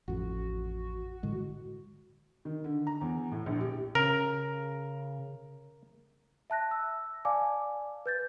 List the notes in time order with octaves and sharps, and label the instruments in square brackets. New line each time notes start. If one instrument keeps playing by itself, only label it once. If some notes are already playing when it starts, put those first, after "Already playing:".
[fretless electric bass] A1 F2 [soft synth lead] F#4
[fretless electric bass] A2 D3 G#3
[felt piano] D#3
D3
A#5
E2
A2
A#1
G4
[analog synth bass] C#3 [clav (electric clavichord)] A#4
[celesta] E5 A5 F#6 A#6
E6
D5 F5 G#5 A5 D6
B4 G6 A6